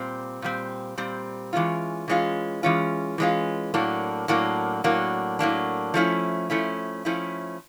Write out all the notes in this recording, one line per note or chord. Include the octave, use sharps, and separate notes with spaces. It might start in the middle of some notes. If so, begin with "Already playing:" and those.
Already playing: A#2 G3 C4
A#2 G3 C4
A#2 G3 C4
E3 G#3 C#4 F4
E3 G#3 C#4 F4
E3 G#3 C#4 F4
E3 G#3 C#4 F4
A2 F#3 A#3 D4
A2 F#3 A#3 D4
A2 F#3 A#3 D4
A2 F#3 A#3 D4
F3 A3 C#4 E4
F3 A3 C#4 E4
F3 A3 C#4 E4